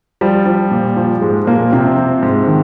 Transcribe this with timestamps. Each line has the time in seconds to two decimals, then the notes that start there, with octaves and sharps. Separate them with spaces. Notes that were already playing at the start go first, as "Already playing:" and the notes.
0.21 F3 G3
0.46 F3
0.71 A#2
0.97 F3
1.22 G#2 G#3
1.47 A#2 F3 A#3
1.72 C3 F3 C4
1.97 F3
2.23 G#2
2.47 D#3